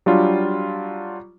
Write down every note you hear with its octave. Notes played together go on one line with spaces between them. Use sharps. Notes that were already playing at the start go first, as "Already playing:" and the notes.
F#3 G3 D4 F4